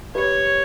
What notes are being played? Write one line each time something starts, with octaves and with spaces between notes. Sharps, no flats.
G4 B4 C#5